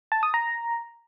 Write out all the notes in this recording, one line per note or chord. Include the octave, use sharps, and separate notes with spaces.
A5
D#6
A#5